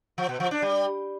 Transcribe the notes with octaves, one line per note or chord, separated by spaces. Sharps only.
F3
B2
F3
D4
G3